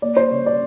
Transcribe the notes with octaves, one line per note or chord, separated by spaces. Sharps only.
A#3 D5
C5
C#3 C#5
D5